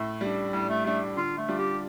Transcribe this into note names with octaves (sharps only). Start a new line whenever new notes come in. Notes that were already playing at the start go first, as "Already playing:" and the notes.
Already playing: A2 A3
G3 D4
A2 G3
A3
G3 A3 D4
D3 F4
A3
G3 D4 F4
G4